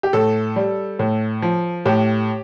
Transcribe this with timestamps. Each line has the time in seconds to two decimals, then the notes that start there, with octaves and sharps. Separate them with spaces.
0.03 G4
0.13 A2 A4
0.56 G3
0.99 A2
1.42 F3
1.85 A2 G4